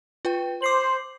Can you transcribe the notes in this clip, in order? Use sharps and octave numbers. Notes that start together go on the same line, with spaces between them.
F4 B4 G5
C5 D6 C7 F#7